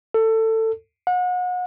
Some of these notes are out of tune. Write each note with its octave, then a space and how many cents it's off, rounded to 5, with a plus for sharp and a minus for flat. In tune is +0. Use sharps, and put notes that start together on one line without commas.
A4 +20
F#5 -35